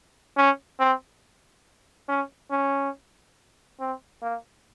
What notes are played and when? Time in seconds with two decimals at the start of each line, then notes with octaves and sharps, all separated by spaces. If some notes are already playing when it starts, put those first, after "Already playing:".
0.37 C#4
0.80 C4
2.08 C#4
2.51 C#4
3.80 C4
4.22 A#3